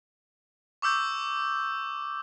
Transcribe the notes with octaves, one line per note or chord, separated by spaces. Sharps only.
C#6 D6 E6 G6